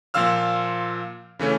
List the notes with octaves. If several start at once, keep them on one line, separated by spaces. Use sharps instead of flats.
A#2 F3 F4 F5 E6 F6
C#3 E3 A3 C#4